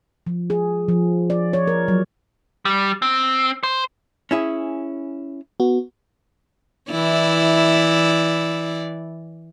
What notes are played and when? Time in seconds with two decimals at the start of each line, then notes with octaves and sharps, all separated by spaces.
0.27 F3
0.50 G#4
0.89 F3
1.30 D5
1.53 C#5
1.67 A#4
1.88 F#3
2.65 G3
3.02 C4
3.63 C5
4.31 C#4 E4 G#4
5.60 B3 F#4
6.91 E3 E4 D5